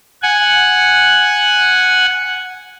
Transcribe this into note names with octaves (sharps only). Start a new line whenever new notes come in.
F#5 G#5